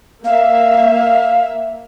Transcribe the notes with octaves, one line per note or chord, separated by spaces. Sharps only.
A#3 E5 F5